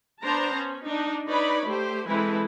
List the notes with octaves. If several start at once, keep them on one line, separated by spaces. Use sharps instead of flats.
B3 D4 C5 A5 A#5
C#4
D4 D#4
D#4 B4 C#5 D5 B5
A3 G4 C5
E3 G#3 C4 E4 A4 B4